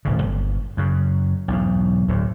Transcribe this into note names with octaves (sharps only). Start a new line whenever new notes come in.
D1 A1 C#3
G1
F#2 C#3
B1 E2 G#2
D1 D2 A2